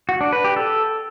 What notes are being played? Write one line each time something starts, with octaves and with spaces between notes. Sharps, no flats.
F#4
D4
B4
G4
A4